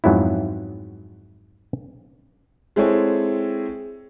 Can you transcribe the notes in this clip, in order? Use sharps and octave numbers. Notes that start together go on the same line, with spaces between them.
F2 G#2 F#3 B3 E4
G#3 C4 E4 G#4 A4 C#5